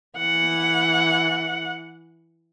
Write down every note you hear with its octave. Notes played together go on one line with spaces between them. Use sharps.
E3 F#5